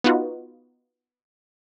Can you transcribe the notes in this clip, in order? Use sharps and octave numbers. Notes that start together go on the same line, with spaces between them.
B3 D#4 F4 F#4